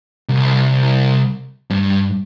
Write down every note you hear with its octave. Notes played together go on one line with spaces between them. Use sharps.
C2
G2